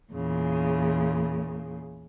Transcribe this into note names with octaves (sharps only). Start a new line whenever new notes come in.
E2 A#2 C#3